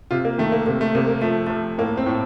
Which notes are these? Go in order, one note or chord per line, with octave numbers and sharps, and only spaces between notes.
C3 F4
A#3
D#3 A3
A#3
C3 A#3
A3
C3 A#3
A#3
F3 A3
F3 A3
A2 A#3
C4
A2